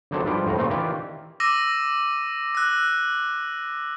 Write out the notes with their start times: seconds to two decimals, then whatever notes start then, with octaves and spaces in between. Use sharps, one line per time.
0.11 G#1 D3 F#3 C4 A4 C#5
0.26 G#2 F3 G3 F4 B4 G5
0.45 F2 A2 C3 A#5
0.57 A#2 C#3 A3 C4
0.70 D#3 E3 F4 G4 D5
1.40 D6 E6 A#6 D#7
2.55 E6 F#6